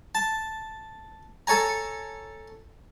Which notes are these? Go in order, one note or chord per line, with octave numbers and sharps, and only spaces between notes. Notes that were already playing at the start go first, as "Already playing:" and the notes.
A5
A4 C#5 G#5 A#5